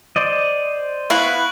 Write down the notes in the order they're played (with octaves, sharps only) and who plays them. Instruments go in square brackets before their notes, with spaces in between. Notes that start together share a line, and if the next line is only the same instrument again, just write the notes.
[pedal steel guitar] C5 D5 D#5
[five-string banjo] B3 F5 [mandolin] E4 [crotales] C#6 F#6 F#7